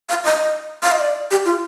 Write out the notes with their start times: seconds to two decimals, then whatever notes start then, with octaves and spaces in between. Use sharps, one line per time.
0.09 F5
0.24 D#5
0.83 F5
0.92 D#5
1.00 D5
1.31 G4
1.45 F4